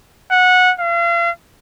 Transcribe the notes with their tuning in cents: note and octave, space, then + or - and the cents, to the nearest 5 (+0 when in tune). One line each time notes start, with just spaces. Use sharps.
F#5 -15
F5 -40